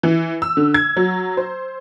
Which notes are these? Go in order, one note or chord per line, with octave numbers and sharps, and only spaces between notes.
E3
E6
D3
G#6
F#3
C5